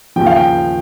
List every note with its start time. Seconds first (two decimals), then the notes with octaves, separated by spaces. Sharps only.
0.16 D#2 C#3 F3 G5
0.26 F5
0.36 G5